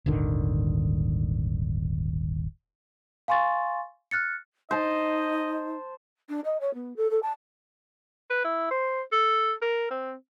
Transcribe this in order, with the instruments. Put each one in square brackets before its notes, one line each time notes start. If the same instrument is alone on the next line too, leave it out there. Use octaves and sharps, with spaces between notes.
[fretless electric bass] D#1 G#1 D3 D#3
[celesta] F5 G#5 C6 C#6 A6
F6 F#6 A6 C#7
[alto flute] D#4 [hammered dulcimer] C5 A5 [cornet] D#5
[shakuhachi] D4
D#5
C#5
B3
A4
A4
A5
[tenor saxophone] B4
E4
C5
A4
A#4
C4